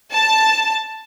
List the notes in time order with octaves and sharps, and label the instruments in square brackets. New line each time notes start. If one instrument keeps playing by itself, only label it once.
[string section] A5